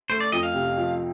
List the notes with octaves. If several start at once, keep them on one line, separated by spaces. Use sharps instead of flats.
A3 C5
D5
F2 D#5
F5
C3
F3